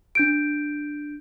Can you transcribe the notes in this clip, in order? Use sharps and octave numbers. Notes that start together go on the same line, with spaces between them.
D4 G6 D7